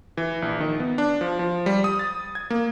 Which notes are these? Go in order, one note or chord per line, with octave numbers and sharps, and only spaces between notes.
E3
A#1
D#3
B3
D4
F3
F3
G3
D#6
A6
G#6
A#3